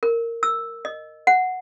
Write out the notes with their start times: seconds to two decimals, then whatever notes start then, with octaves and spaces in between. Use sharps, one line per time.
0.03 A#4
0.43 E6
0.85 D#5
1.27 F#5